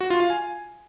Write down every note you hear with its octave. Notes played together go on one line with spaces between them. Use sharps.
F#4
F4
F5
G#5